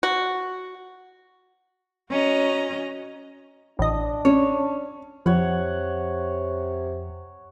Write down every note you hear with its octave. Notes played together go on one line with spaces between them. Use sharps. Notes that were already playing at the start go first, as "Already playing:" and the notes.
F#4
C#4 F#4 D#5 A#5
A1 D4 D#5
C#4 C#5
F2 C3 F3 C#5 F#5